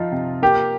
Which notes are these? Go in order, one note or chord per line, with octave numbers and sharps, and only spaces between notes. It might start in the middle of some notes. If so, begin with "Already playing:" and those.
Already playing: F3 D#4 F4
C3
A#3 G4